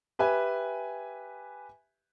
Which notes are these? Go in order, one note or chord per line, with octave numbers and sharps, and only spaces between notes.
G4 B4 E5 G#5